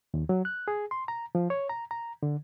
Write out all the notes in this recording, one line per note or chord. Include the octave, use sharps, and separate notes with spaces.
D#2
F#3
F#6
G#4
C6
A#5
F3
C#5
A#5
A#5
D3